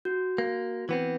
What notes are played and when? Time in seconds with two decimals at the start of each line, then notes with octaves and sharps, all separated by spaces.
0.05 F#4
0.38 A#3
0.89 E3 B3 C4